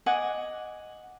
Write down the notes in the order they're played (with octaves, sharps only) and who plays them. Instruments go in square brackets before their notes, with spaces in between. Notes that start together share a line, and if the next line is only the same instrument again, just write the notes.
[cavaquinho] D#5 F#5 G#5 D6